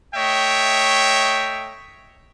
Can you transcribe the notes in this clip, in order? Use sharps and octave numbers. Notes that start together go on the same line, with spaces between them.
A3 C#5 D#5 E5 G5